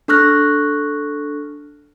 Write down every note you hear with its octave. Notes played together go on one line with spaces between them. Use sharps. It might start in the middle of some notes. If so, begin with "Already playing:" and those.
D4 A4 C#6 F6 F#6 A#6